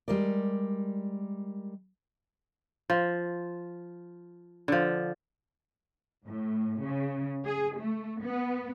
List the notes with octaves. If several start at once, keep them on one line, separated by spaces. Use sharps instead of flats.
G3 G#3 A#4 D5
F3
D3 F3
A2
C#3
G#4
A3
B3